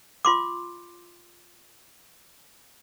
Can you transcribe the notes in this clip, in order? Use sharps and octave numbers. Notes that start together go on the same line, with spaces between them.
F4 C6 D6